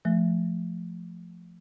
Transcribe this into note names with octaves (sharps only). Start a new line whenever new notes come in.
F3 A3